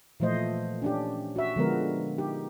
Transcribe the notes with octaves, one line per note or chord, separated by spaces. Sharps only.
A#2 E3 F3 A3 C5 D#5
C#4 D4 G4
F#4 E5
D3 F3 G#3 B3 A#4
D#4 G4